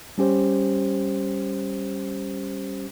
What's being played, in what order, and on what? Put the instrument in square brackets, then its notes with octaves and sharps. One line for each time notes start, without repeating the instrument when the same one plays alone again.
[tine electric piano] G3 C#4 G4 C5